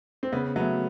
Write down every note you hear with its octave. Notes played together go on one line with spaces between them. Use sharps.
C4
C#3 B3
F#3 A3 B3